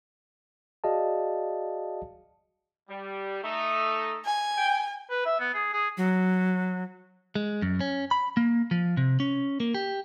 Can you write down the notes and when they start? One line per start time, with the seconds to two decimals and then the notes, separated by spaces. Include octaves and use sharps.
0.84 F#4 G#4 D5 D#5 F5 A5
2.89 G3
3.43 A3 D#4
4.25 G#5
4.57 G5
5.10 B4
5.26 E5
5.40 B3
5.54 G#4
5.73 G#4
5.97 F#3
7.35 G#3
7.62 F#2
7.81 C#4
8.11 B5
8.37 A#3
8.71 F3
8.97 C3
9.20 C#4
9.60 A#3
9.74 G4